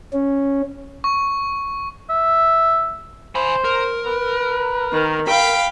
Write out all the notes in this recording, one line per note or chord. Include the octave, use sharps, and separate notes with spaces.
C#4
C#6
E5
C5 G#5 B5
A#4
B4
D#3
F5 G5 B5